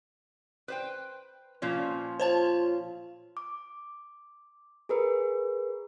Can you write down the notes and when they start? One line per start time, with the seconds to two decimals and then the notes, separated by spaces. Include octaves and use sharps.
0.68 B4 C5 G5
1.62 A#2 F3 C#4
2.20 F4 C5 C#5 A5
3.37 D6
4.89 G#4 A#4 B4